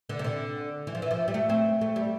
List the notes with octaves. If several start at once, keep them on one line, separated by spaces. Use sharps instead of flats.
D3
C3
D3
E3
F3
E3
F3
G3
A3
C4
A3
G3